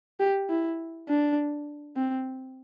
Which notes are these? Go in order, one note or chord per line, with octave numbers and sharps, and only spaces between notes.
G4
E4
D4
C4